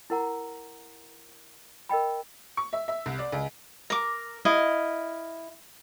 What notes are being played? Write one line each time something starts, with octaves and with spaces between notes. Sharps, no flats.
E4 A#4 F#5 A#5
A#4 D#5 G5 B5
C#6
E5
E5
C2
D5
C#2
A#4 D6
E4 D#5 F5